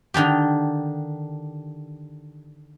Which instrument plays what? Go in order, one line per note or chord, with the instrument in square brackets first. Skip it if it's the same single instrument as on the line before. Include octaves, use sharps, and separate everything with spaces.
[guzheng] D3 D#3 D4 G4